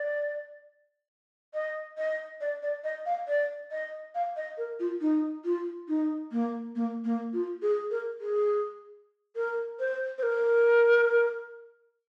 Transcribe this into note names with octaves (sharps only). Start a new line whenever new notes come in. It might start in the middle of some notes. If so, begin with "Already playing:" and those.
Already playing: D5
D#5
D#5
D5
D5
D#5
F5
D5
D#5
F5
D#5
A#4
F4
D#4
F4
D#4
A#3
A#3
A#3
F4
G#4
A#4
G#4
A#4
C5
C5
A#4